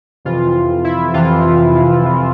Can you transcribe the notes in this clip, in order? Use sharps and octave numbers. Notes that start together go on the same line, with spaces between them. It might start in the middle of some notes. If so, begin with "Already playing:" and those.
F2 C3 E3 F4
E4
F2 C3 E3 F4
F2 C3 E3